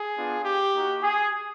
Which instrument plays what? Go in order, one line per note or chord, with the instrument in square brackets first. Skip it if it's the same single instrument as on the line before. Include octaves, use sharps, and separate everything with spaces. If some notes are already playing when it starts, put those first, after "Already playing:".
Already playing: [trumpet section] G#4
B3 D4 F4
G4
A#3 D#4 F#4
G#4